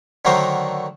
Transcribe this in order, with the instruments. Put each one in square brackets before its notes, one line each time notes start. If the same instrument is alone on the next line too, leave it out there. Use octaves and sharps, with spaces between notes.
[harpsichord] D3 D#3 F#3 A3 A#4 C5